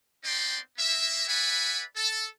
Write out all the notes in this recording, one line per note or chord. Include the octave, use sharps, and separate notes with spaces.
B3 C4 D#4 D5 G5 C6
A#3 E5
B4 D5 E5 F#5 G#5 B5
A4